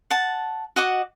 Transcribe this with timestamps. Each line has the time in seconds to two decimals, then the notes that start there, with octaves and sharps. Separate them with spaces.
0.10 F#5 A5
0.76 F#4 D#5 F#5 D6